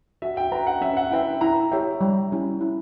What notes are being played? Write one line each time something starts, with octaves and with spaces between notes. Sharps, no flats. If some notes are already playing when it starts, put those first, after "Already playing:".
F#4 E5
G5
B4 F#5 A#5
F#5
C#4 E5
F#5
E4 B4 E5 G5
E4 A#5
G4 C#5 E5 G5
G3
C#4 E4 G4
E4